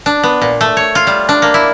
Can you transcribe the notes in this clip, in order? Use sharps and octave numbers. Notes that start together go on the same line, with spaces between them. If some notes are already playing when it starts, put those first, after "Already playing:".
D4
B3
A#2
A3
C#5
F4
G3
D4
A#3
E4